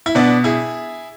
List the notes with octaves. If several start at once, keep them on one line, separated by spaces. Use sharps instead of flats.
E4
B2 B3 D4
E4 G#4